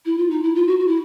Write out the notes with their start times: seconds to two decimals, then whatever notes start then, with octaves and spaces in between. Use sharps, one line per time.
0.05 E4
0.18 F4
0.30 D#4
0.43 E4
0.55 F4
0.67 F#4
0.79 F#4
0.88 E4